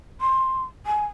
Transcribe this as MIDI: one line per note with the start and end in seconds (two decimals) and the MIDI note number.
0.21 0.63 84
0.86 1.06 80